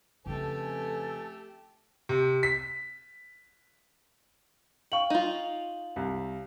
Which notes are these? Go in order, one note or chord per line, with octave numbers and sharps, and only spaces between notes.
F2 C#3 A3 C#4 G4 A4 B4 G#5
C3
B6
F5 G5 C#6 F#7
D#4 F4
C2